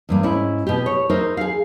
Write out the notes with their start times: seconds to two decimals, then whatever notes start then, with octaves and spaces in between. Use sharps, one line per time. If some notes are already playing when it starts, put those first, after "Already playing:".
0.09 E2 G2 A#3
0.23 G#2 C#4 E4
0.67 B2 G4
0.86 C#5
1.10 D#4 A#4 C5 E5
1.37 G#4 F5